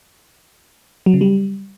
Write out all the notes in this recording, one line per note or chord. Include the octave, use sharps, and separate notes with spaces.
F#3
C#3
G3